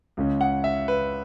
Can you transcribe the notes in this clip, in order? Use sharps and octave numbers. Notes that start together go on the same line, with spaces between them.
C#2 C#3 G#3 C#4
F#5
E5
B4